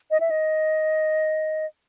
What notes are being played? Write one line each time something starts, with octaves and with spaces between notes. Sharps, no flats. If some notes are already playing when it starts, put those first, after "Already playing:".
D#5
E5
D#5